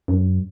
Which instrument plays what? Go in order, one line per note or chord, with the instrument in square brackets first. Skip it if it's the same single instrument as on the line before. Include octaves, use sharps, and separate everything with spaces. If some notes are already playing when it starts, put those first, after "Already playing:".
[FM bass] F#2